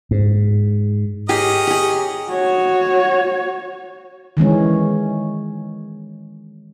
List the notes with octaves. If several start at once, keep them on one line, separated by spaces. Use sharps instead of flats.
G#2
C#4 G4 G#4 A#4 D#5
G4 G#4
F#4 C#5
D#3 E3 G#3 C#4